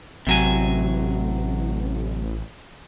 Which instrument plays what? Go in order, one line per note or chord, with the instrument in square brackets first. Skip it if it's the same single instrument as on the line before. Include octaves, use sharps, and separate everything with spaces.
[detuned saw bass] A1 [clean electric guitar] C3 F#3 G#5